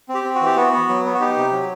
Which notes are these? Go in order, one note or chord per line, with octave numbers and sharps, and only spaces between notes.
C4
G4
C4
F#4
E3 G4
B3 F#4
B3
F#3
B3
F#4
D#4 G4
C3
F#3